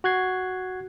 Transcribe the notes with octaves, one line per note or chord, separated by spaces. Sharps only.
F#4 F#6 G#6 C7